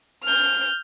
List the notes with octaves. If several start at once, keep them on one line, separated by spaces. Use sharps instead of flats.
F6 G6